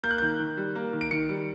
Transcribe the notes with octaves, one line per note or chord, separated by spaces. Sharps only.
A#3 G6
F#6
D#3 G6
D#3
G3
A#3
D#3
D7
D#3 C#7
G3